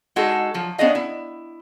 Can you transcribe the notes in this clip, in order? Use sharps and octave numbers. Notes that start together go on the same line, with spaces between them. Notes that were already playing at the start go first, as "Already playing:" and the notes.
G#3 D#4 F#4 G#4 A4
F3 F#3
B3 C#4 D4 G#4 D#5 F5
E4